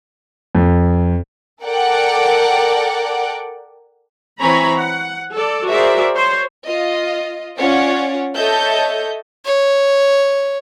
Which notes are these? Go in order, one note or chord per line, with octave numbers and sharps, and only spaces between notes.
F2
A4 A#4 D5 F#5 G5
E3 C4 C#5 G#5 A#5 B5
F#5
A4 D5
F#4 G#4 A#4 C5 D5 E5
C5 C#5
F4 D#5
C#4 F4 C#5 D5 F#5
A4 C#5 D#5 E5 A5 G6
C#5